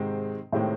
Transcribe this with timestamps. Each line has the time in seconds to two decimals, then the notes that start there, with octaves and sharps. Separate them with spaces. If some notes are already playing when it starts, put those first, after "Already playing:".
Already playing: G#2 C3 D#3 G#3 C4
0.53 A2 C3 D#3 G#3 C4